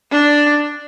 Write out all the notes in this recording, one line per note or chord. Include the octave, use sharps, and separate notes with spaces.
D4